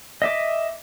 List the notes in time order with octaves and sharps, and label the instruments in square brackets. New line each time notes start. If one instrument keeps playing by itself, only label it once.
[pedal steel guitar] D#5 E5 D6